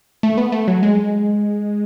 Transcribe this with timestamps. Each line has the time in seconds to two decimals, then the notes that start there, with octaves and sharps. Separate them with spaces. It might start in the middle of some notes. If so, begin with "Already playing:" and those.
0.23 A3
0.38 B3
0.52 A3
0.68 F#3
0.83 G#3